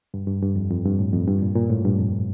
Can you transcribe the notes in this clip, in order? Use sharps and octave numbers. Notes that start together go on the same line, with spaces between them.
G2
G2
G2
F2
F2
G2
A2
F2
G2
A#2
A#2
A2
G2
F2